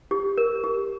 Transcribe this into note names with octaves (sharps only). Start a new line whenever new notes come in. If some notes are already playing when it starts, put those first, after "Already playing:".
G4
A#4
G4